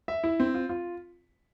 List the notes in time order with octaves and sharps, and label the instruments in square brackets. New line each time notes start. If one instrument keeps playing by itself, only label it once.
[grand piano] E5
E4
C4
F4
F4